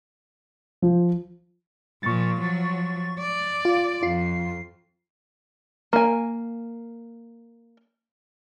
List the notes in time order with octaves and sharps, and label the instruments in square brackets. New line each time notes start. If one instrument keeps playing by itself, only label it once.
[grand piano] F3
[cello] A#2 F3 [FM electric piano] C#6 A6
[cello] F3 F#3
D5
[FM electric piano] F4
[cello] F2 [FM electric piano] F4 C7
[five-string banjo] A#3 G#5